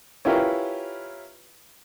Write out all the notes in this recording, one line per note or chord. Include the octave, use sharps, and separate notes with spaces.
C#4 E4 F4 G4 A#4 B4